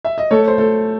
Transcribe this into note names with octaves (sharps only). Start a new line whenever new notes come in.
E5
D#5
A3 A4 C#5
C5
A3 A4